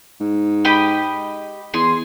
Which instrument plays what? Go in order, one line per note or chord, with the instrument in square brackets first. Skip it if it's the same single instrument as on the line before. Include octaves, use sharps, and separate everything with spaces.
[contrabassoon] G#2
[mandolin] G4 D#5 B5
[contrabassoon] E2 [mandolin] G#4 C6